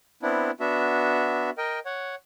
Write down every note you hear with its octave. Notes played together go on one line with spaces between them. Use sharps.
B3 C4 D4 E4
B3 D4 F#4 E5
A#4 D#5 G5
C#5 F#5